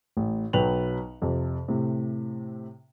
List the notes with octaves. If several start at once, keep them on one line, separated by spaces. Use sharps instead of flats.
A1
B1 F#3 B4 G5 F7 F#7
F2 C3
A2 C3